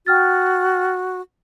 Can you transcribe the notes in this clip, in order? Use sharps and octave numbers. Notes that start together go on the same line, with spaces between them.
F#4 G5 F6 A6